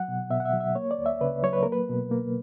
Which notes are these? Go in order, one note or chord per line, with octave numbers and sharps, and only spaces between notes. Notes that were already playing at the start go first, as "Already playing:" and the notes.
Already playing: F#3 F#5
B2
B2 E5
F#5
E5
F#3
E5
A#3 C#5
D5
D2
E5
C#3 B4
F#3 C#5
B4
A#3 A#4
B4
B2
A#3